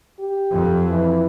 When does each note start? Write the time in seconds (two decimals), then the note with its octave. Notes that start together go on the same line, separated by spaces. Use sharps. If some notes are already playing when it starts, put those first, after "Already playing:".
0.20 G4
0.53 F2
0.89 E3